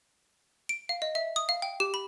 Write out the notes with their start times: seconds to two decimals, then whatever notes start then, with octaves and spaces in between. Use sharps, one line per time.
0.69 D7
0.89 F5
1.02 D#5
1.15 E5
1.36 D#6
1.49 F5
1.62 G5
1.80 G4
1.94 B5